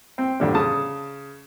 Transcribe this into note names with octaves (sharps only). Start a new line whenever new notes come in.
C4
F2 D3 G3
C#3 A5 D#6